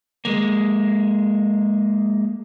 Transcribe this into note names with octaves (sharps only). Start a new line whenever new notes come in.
G#3 A#3